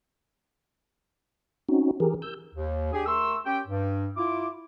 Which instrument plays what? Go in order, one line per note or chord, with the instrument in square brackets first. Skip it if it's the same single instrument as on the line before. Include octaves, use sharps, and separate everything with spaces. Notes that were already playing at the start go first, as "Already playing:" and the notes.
[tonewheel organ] C4 C#4 D#4 F#4
E3 G4 G#4 A#4
E6 G6
[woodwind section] D#2
D4 G4 G#4
A3 A#4 C6 C#6 E6
C#4 G4 G5
G2
E4 F4 D6